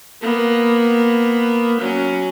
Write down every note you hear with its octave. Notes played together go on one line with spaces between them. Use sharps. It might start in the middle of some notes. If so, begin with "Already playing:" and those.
A#3 B3
F#3 C#4